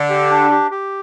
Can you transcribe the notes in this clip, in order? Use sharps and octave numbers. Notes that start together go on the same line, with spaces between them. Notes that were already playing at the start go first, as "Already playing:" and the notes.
Already playing: D3
G4
D4
G4
G4